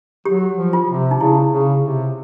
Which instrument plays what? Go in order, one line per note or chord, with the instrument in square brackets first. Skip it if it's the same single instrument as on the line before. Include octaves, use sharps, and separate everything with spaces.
[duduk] F#3 [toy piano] G4
[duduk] F3
[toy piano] F4
[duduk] C3
[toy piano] D#4
[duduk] C#3 [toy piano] E4
[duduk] C#3
C3